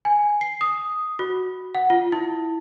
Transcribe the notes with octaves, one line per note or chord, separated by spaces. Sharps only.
G#5
C7
D#6
F#4
F#5
F4
E4